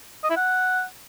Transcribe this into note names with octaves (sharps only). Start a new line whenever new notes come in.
D#5
E4
F#5